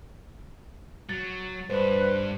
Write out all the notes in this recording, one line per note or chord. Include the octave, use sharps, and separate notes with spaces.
F#3 A6
G2 D4 B4 C5